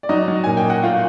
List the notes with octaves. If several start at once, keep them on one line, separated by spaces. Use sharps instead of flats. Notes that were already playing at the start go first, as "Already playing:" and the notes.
D5
F#3 D#4 D#5
F#3
A#2 G#5
G5
A#2
F#5
A3 F4 F5